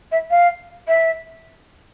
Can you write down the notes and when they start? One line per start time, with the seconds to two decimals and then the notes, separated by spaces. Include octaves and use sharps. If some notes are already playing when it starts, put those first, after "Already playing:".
0.12 E5
0.31 F5
0.88 E5